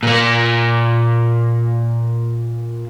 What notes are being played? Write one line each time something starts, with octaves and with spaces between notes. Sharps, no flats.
A#2 A#3